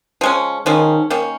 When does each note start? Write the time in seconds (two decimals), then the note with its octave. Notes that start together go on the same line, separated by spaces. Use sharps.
0.21 F3 G#3 C#4
0.66 D#3 F3 G#3 C#4
1.10 D#3 A#3 C#4